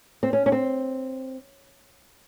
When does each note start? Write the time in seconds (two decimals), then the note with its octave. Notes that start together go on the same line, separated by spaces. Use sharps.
0.23 C4
0.33 C#4
0.46 C#4
0.52 C4